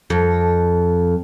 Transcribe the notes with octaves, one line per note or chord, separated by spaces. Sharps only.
F2